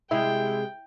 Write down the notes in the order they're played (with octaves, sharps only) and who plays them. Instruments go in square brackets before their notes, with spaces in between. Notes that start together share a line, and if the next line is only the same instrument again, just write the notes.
[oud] C3 G#3 G#4 [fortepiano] E4 [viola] G5